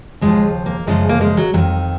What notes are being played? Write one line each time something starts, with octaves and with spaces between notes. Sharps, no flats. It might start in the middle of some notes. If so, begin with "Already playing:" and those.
D#2 C#3 F3 G#3
A#3
F#2 C#3 F3 G#3
A#3
G#3
F#3
F2 D#3 F#3